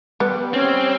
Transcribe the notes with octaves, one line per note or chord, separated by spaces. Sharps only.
G3 B3
C4 C#4